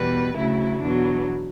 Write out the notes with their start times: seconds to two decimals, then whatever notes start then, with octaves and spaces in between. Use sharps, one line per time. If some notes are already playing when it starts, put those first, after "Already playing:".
Already playing: E2 B2 G3 B4
0.36 D2 C#3 F#3 E4
0.82 E2 B2 F#3 D4